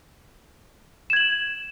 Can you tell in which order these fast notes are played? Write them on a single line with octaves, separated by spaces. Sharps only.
E7 G#6 F#7